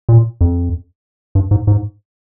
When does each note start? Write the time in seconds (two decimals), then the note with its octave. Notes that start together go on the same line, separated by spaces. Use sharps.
0.09 A#2
0.41 F2
1.35 G2
1.51 G#2
1.67 G#2